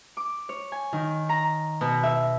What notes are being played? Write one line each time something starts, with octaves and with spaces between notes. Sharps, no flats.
D6
C#5
G#5
D#3
A#5
B2
E5